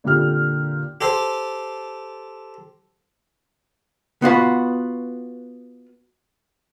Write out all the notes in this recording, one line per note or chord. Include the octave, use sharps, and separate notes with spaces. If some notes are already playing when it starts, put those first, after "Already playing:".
A#2 D3 C4 G4 F6
G4 A4 C5
B3 F4 F#4 B4